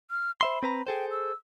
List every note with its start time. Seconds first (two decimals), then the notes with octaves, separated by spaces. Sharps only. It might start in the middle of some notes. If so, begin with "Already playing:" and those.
0.11 F6
0.41 C5 E5 B5 C6
0.63 C4 B4 A#5
0.87 G#4 A4 C5 G5
1.11 E6